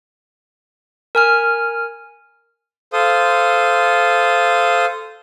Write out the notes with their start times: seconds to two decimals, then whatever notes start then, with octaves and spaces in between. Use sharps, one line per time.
1.15 A#4 G#5 F6
2.93 A4 C5 F5 D#6